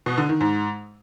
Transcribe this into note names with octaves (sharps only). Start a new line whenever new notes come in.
B2
D3
D#3
G#2